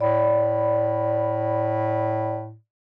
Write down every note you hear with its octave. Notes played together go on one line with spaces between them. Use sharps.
A2 D5 B5